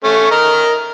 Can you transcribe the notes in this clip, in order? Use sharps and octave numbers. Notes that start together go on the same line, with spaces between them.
A3 C#4
A#4 D#5 F6